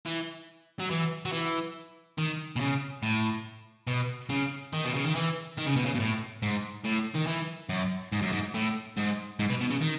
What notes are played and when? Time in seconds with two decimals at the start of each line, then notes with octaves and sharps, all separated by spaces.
0.06 E3
0.80 F#3
0.91 E3
1.25 F#3
1.33 E3
2.18 D#3
2.56 B2
2.60 C#3
3.03 A2
3.87 B2
4.30 C#3
4.73 D#3
4.84 B2
4.94 C#3
5.05 D#3
5.15 E3
5.58 D#3
5.66 C#3
5.76 B2
5.86 C#3
5.95 B2
6.00 A2
6.43 G#2
6.85 A2
7.15 D#3
7.27 E3
7.69 F#2
8.12 G#2
8.22 F#2
8.32 G#2
8.54 A2
8.97 G#2
9.39 G#2
9.50 B2
9.61 B2
9.70 C#3
9.81 D#3